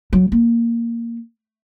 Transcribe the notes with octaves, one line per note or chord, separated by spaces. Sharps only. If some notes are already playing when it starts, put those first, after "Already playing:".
F#3
A#3